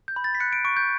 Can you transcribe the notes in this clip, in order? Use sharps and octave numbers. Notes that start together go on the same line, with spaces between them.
G6
B5
A6
B6
F#6 C#7
D7
C#6 D7
G6